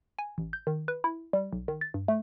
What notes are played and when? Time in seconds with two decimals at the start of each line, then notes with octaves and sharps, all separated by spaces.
0.19 G#5
0.38 A1
0.53 G6
0.67 D#3
0.88 B4
1.04 E4
1.33 G3
1.53 B1
1.68 D#3
1.81 A6
1.94 G2
2.08 A3